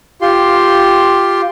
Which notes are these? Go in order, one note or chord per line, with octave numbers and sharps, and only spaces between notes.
F4 G4 C6